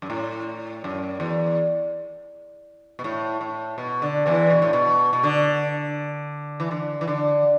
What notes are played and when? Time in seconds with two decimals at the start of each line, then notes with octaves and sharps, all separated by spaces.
0.02 F#2
0.10 A2
0.84 F#2
1.20 E2
2.99 B2
3.04 A2
3.41 A2
3.78 B2
4.02 D3
4.26 E2 E3
4.50 B2
4.62 A2
4.73 B2
5.13 B2
5.23 D3
6.60 E3
6.71 D3
7.01 E3
7.08 D3